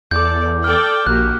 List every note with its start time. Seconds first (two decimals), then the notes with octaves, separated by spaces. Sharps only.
0.11 E2 A4 D5 D6 G6
0.64 A4 D5 G5 F6
1.07 A#1 A#3 F#4 G4 F#6